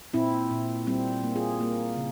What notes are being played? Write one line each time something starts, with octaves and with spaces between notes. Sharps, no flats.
A#2 C4 E4
A#2
G3 C4
A#3
F4 G#4
A#3
C#3